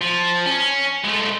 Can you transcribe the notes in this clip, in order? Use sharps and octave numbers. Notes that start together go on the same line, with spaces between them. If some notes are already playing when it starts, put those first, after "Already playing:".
F3
C#4
G#3 A3